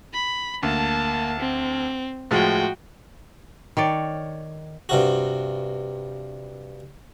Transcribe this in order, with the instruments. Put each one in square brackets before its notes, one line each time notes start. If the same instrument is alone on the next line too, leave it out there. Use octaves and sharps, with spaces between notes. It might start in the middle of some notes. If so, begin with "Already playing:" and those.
[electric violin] B5
[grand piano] D2 [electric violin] A#3 A5
[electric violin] C4
[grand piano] A2 F3 G#3 [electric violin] F#4 G5
[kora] D#3 C#5 D5
[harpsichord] G2 C3 F#4